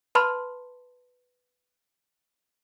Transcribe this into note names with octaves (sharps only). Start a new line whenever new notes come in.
B4 A5 B5 C6 F6